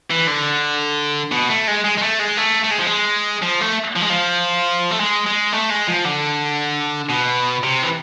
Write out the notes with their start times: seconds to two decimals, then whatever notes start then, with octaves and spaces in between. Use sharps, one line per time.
0.11 E3
0.27 D3
1.32 B2
1.50 A3
1.68 G#3
1.85 G#3
1.98 G#3
2.02 A3
2.19 G#3
2.37 A3
2.64 A3
2.71 G#3
2.79 F3
2.87 G#3
3.42 F3
3.61 A3
3.96 F3
4.02 G#3
4.10 F3
4.91 A3
5.00 G#3
5.26 G#3
5.53 A3
5.71 G#3
5.88 F3
6.05 D3
7.10 B2
7.63 C3
7.83 E3